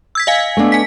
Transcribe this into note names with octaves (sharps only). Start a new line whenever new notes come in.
E6 G#6 B6
D#5 F5 G#5
A3 B3 D4
G#5 B6